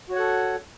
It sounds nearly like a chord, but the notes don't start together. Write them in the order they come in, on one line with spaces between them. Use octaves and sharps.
F#4 C#5 F#5 A4